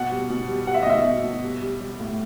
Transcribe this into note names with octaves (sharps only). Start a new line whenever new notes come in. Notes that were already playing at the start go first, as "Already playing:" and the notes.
Already playing: B2 F#5
G3
B2
G3
G3 F#5
E5
D#5
B2 E5
B2
B2
G3
G3
G3
A2